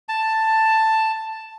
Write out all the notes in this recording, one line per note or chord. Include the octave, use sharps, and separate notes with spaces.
A5